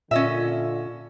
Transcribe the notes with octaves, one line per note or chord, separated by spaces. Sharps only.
A#2 D3 C#4 F4 D#5 E5